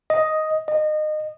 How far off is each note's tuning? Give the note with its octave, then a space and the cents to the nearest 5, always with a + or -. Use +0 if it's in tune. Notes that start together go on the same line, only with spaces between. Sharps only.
D#5 +5
D#5 -25